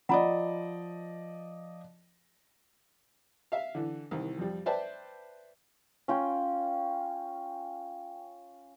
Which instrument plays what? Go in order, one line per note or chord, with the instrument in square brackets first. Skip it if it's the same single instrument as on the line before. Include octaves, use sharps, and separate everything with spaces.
[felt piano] F3 D5 D#5 [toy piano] F#5 A#5 B5
[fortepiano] E5 F5
D3 E3
C2 D#3 E3
F2 G3
B4 C5 D5 E5 G5 A5
[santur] C#4 F4 G5